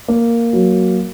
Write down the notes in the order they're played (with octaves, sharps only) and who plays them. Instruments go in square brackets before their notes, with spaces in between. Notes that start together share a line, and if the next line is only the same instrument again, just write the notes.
[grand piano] A#3
F#3